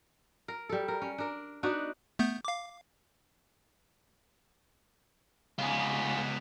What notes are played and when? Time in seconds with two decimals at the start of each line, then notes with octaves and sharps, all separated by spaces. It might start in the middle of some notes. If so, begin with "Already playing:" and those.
0.48 A#4
0.69 G3 A4
0.88 A#4
1.02 C#4
1.18 D4 A#4
1.63 B3 D4 D#4 F#4
2.19 A3 B3 G6
2.45 F5 D6
5.59 C#2 B3 F4 G#4